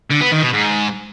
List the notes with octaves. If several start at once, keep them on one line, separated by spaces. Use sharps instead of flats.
D3
B3
D#3
B2
G#2